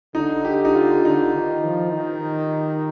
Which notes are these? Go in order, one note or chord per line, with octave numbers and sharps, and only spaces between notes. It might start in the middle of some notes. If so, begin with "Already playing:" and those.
D3 D#4
G4
D#4
F4
D3 D#4
D#3
F3
D#3